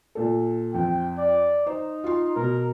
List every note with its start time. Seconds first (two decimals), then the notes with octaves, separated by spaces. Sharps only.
0.15 A#2 A4
0.74 F2 C4 G5
1.18 D5
1.67 D#4 C5
2.04 F4 C6
2.36 B2 A#4